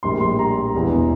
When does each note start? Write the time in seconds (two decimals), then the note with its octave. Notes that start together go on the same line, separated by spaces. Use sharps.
0.03 A#1 A2 G3 A#3 C6
0.21 C6
0.39 A#5
0.74 E1 E2 E3